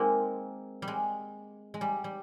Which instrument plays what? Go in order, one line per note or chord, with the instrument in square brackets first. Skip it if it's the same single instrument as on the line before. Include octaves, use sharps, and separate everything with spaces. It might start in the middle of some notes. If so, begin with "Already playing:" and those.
Already playing: [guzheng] G#3 A#3 C4 D#4
G3
G#3
G#3
G3
G3